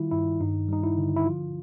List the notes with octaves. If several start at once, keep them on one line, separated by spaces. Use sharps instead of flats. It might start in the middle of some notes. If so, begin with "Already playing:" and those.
Already playing: D#3 G3 E4 F4
G2 E4
G2 D#4
G3 D#4
E4
D3
E4
F3 F4